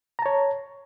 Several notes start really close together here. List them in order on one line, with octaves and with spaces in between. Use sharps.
A#5 A5 C#5